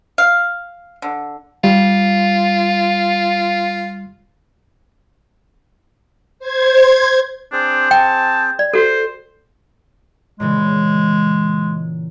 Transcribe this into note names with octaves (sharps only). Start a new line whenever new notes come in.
F5
D3
G3 F4
C5 G#6
C4 D4 G#4 C5
G5 A5
D5
F#4 A4 C5
A#2 C#3 E3 G#3